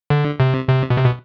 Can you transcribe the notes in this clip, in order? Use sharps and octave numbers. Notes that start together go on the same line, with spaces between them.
D3
C3
C3
B2
C3
B2